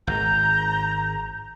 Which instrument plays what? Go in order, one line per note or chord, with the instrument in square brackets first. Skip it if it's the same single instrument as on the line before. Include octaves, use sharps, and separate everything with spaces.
[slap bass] G#1 [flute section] A#5 [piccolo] G6